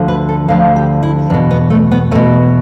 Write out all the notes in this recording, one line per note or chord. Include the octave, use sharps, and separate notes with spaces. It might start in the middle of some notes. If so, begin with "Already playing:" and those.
Already playing: D2 D3 F3
B4
A4
D2 D3 F3 F5
G4
E4
E2 B2 D4
B3
A3
B3
E2 B2 A3